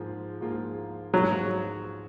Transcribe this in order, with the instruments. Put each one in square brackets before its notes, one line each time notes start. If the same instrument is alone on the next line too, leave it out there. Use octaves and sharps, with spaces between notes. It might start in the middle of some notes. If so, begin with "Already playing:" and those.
Already playing: [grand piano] G#2 F3 A#3 F4 G#4
G#2 F3 A#3 F4 G#4
[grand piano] G#2 F3 A#3 F4 G#4 [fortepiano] F#3